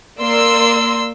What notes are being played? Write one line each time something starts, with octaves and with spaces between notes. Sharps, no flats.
A#3 D5 C6 E6